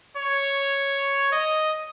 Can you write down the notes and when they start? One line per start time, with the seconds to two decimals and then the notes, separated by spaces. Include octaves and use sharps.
0.17 C#5
1.32 D#5